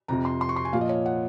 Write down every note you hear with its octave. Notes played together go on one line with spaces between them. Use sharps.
F2 C3 F3 A#5
C6
C6
C#6
C6
G#5
A#2 F3 F5
D#5
C#5
F#5